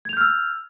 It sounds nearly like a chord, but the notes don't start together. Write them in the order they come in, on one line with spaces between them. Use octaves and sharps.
G#6 F7 G6 F6 E6